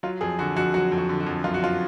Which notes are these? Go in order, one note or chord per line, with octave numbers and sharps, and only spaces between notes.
F#3 F4
F2 G#4
D3 F#4
F2 F#4
F#3 F#4
F2
F#4
D3
F#4
F2
F#2 F4
F#4
F3 F4